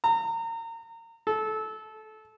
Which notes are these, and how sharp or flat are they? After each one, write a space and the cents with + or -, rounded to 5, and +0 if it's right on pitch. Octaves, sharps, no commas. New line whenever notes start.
A#5 -30
A4 -20